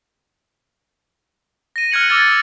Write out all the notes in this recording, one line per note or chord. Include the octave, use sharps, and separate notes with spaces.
A#6 D#7
F6 F#6 G#6 C#7 F#7
D6 E6 F6 A6 A#6